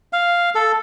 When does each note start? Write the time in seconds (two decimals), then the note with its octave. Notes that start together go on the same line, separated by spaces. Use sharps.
0.13 F5
0.55 A4